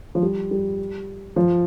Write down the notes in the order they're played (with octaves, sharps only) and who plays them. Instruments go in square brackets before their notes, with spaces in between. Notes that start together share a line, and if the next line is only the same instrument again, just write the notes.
[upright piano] F3
G3
G3
F3